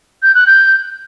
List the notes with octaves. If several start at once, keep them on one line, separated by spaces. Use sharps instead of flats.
G6
F#6
G6